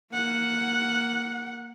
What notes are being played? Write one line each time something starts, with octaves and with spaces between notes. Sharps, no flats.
A#3 F#5